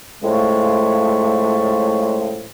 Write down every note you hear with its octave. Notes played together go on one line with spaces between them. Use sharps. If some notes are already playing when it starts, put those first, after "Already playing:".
A2 C#3 F3 G#3 A3